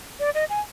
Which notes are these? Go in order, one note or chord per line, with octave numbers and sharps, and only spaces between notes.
D5
D#5
G#5